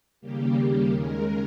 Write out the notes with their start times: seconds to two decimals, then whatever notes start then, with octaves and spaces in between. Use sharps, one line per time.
0.21 D#2 C#3 G3 A#3 G4
0.90 D#2 C#3 G#3 A#4